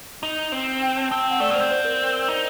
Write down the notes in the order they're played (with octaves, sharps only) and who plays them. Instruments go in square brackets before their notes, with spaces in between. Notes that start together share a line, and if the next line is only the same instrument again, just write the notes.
[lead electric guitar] D#4
C4
[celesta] G5
A5
[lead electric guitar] C4 [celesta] A5
[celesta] G5
F#5
[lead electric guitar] A3 [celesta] D5
[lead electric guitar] A#3
[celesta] C5
[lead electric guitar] C4
[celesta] C5
A#4
[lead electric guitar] D#4